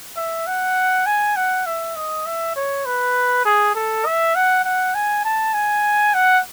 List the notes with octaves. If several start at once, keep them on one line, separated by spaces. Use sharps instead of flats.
E5
F#5
G#5
F#5
E5
D#5
E5
C#5
B4
G#4
A4
E5
F#5
F#5
G#5
A5
G#5
F#5